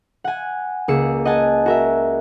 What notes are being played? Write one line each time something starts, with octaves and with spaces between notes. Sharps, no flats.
F#5 G#5
C#2 A#3 G#4 E6 C#7
D#5 F#5 G#5 A5
F#4 A#4 E5